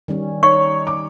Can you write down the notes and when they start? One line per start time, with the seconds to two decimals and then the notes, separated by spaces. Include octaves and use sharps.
0.08 D#3 G3 C#4
0.43 D#4 C#5 C#6
0.87 D6